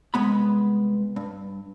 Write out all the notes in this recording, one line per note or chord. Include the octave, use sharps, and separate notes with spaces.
C2 G#3 B3 B5
G2